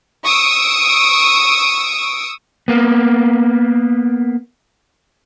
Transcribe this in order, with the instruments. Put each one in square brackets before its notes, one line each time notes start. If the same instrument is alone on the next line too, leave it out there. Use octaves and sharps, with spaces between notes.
[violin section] C#6 D#6 E6 D7
[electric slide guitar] A#3 B3